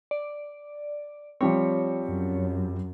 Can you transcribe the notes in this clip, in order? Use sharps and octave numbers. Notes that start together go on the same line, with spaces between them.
D5
F3 G3 C4 C#5
F#2